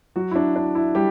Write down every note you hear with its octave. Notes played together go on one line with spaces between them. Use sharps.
F#3 F#4
E4
D4
D4
E4
G3 G4